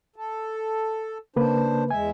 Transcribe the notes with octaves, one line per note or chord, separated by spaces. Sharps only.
A4
C#3 A#3 D4 B4 C5
E2 G#3 E5 G#5